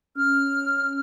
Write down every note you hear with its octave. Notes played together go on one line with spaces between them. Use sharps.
C#4 F6